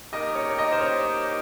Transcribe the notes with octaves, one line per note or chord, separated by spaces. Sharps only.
D#3 A#3 D#4 G4 A#4 D#5
C#5
C#5
D#5
C5
C#5